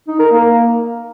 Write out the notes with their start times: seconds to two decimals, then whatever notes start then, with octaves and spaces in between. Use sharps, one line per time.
0.08 D#4
0.19 A#4
0.31 A#3